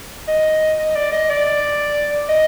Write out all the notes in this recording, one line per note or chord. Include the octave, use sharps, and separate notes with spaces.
D#5
D#5
D5
D#5
D5
D#5